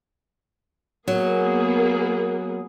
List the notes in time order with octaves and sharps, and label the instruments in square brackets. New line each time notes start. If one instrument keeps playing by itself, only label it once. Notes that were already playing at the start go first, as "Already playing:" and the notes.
[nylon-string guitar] F#3 [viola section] A#3 B3 G#4